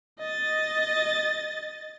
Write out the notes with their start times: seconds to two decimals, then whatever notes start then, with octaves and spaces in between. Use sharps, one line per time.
0.20 D#5 A6